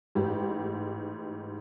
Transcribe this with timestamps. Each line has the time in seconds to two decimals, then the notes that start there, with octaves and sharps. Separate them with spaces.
0.15 A1 G#2 G4